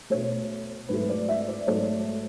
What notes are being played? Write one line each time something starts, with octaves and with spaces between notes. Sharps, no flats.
B2 A3 C#5
G#2 F#3 A3 B4
D5
E5
D5
G#2 F#3 A3 C#5